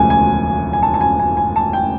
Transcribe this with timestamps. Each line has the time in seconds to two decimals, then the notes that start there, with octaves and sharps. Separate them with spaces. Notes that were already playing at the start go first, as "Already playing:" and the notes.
Already playing: E1 D2 C#3 F3 G#5
0.10 G#5
0.73 G#5
0.83 A5
0.94 A5
1.01 G#5
1.20 G#5
1.37 G#5
1.56 A5
1.73 G5